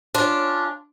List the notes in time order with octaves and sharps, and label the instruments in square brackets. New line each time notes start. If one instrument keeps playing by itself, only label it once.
[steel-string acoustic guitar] C#4 D4 F4